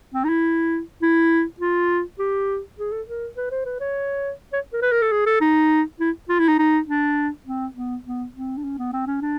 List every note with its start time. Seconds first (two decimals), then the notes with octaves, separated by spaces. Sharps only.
0.14 C4
0.24 D#4
0.29 E4
1.02 E4
1.60 F4
2.19 G4
2.78 G#4
2.92 A4
3.07 A#4
3.37 B4
3.51 C5
3.66 B4
3.80 C#5
4.53 C#5
4.74 A#4
4.82 B4
4.92 A#4
5.02 A4
5.12 G#4
5.26 A4
5.41 D#4
6.00 E4
6.29 F4
6.39 E4
6.49 D#4
6.59 D#4
6.88 D4
7.46 C4
7.76 B3
8.05 B3
8.35 C4
8.57 D4
8.64 C#4
8.78 B3
8.93 C4
9.07 C#4
9.22 D4